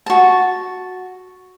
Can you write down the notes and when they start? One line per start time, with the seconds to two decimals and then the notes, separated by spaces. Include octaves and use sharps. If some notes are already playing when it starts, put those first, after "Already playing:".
0.06 F#4 A5